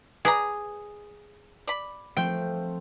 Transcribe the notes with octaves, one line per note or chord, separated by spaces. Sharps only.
G#4 B4 D5 A#5
D5 B5
F3 A3 C4 G5